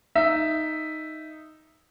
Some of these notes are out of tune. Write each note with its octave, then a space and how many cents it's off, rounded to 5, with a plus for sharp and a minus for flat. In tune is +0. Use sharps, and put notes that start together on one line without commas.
D#4 +0 E5 +0